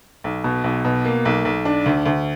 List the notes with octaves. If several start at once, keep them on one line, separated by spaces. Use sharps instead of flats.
B1
B2
B1
B2
A#3
B1
B1
D4
D2
D2